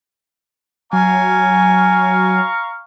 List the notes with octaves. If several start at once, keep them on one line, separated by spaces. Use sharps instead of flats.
F#3 F5 G#5 A#5 C#6